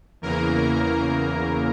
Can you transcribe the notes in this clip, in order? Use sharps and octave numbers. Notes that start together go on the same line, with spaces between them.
E2 C#3 E3 A#3 A#4